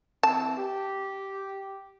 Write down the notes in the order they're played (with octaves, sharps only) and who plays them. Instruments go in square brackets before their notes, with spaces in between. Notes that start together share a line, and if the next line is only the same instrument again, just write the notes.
[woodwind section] E3 C4 [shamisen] A5
[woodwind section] G4